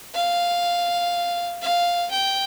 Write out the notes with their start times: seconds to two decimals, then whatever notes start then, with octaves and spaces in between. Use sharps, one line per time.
0.14 F5
1.62 F5
2.11 G5